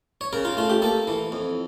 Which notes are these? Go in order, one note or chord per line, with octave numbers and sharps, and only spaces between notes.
C#5
C#3 A#4
F4
A3 F4
G4
A#3 A4
E3
F2